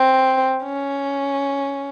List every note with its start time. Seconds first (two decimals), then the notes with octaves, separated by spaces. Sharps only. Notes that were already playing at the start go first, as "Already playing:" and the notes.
Already playing: C4
0.64 C#4